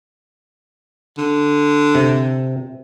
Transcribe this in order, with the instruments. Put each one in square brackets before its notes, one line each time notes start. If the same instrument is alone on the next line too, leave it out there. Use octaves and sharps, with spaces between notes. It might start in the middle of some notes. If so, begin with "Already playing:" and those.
[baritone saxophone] D3
[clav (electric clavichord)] C3